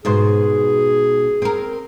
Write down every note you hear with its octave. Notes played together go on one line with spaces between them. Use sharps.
G#2 B2 G#4 C5
C4 A#4